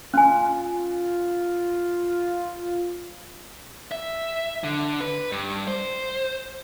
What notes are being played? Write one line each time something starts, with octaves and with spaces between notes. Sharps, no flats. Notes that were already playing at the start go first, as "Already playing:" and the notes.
C#4 F4 G#5
E5
D3
B4
G2
C5